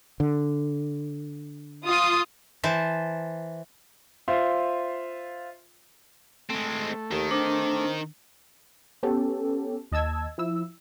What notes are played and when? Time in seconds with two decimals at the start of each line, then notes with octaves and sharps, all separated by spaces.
0.20 D3
1.85 F4 D#6
2.64 E3 C5 A5
4.28 F4 C5 E5 F5 C6
6.50 G#3 A3 C4
7.11 D#2 D#3
7.31 C4 D4
9.03 B3 C#4 G4 A4
9.92 D#2 D#5 A5 E6 G#6
10.38 F3 E4 E6